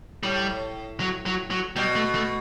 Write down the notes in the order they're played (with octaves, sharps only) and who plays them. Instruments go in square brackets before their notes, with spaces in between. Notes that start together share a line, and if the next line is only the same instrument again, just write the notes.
[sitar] A2 [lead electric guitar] G3
[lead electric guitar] F#3
F#3
F#3
[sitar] B2 [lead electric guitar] G3
[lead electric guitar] A3
A3